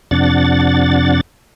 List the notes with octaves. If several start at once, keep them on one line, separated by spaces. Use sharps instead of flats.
F2 C3 D4 F#5 A6